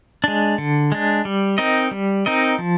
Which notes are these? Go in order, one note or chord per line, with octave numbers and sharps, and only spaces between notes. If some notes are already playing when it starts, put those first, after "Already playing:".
G#3 D4
D3
G#3 D4
G3
C4 D#4 A#4 D#5
G3
C4 D#4 A#4 D#5
F3